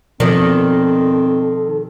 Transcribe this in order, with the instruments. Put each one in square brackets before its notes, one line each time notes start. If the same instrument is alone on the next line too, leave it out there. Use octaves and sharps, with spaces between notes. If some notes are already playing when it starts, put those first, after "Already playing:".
[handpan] B2 F3 D5 [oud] D#3 [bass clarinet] C4 [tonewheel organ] A4